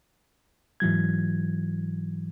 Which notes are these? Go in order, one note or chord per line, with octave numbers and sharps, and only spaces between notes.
G#2 E3 F#3 G#6